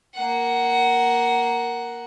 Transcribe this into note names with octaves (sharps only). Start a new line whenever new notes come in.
A#3 F#5